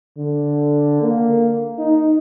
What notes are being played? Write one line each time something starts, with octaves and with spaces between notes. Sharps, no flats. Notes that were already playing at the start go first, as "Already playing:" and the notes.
D3
A#3
D#4